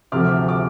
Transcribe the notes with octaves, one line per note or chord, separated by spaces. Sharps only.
D2 C3 F3 D6 F6
D6